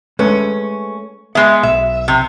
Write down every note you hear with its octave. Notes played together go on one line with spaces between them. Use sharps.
G#3 A3 C#4 B4
G#3 B3 E5
B1 E5
C3